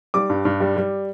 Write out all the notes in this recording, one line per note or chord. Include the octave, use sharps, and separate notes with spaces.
G3 D6
G2
G2
G3
G3